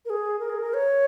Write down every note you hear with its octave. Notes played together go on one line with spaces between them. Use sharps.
A#4
G#4
A#4
G#4
A#4
C#5